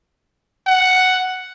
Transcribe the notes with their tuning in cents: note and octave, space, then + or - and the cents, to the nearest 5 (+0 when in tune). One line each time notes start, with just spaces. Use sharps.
F#5 +5